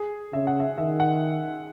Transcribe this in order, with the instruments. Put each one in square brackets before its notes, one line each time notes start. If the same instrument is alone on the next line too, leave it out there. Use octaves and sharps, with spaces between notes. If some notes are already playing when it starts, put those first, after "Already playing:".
Already playing: [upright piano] G#4
[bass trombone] C#3 [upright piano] E5
[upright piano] F#5
E5
[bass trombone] D#3 [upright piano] E5
[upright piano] F#5